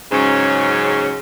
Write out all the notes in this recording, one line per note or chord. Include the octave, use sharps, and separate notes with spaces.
G#2 C#3 F#3 C#4